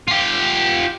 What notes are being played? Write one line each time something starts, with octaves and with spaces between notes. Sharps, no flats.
F4 G4